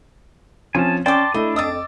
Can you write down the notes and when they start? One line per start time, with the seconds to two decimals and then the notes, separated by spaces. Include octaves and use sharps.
0.75 F3 C4 C#4 G#5 A5
1.06 C#4 D5 G5 A5 C6 D6
1.34 A3 D4 E4 A4 D#5
1.56 F2 D5 D#5 D#6 E6 A6